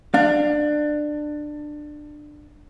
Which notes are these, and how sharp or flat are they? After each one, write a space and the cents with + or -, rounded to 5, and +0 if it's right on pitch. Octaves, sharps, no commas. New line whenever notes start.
D4 +20 F5 -5